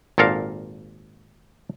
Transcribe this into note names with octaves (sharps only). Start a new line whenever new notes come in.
G#1 A#2 A4 A#4 F5